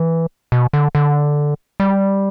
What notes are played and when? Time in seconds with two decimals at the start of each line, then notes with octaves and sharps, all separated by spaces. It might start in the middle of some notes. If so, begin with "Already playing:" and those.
Already playing: E3
0.52 B2
0.73 D3
0.95 D3
1.80 G3